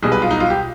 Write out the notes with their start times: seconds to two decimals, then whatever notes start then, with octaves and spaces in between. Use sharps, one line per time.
0.02 B1 B2 G3 G#4
0.12 B4
0.22 F4
0.31 D#4
0.40 F4
0.50 G4